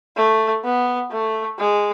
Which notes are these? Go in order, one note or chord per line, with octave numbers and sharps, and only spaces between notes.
A3
B3
A3
G#3